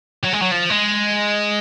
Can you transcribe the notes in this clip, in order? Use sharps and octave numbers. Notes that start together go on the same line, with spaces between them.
F#3
G#3
F#3
F3
G#3